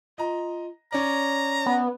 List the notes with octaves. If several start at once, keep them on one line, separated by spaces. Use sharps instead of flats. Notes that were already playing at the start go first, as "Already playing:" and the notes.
F4 D#5 A#5
C#4 C#5 D5 A#5
B3